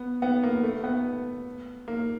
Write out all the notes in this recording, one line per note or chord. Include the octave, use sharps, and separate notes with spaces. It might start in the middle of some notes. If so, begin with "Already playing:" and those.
Already playing: B3
B3
A#3
A3
B3
A#3